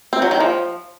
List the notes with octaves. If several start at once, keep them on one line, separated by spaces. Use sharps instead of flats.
C4
F#3
D#3
F3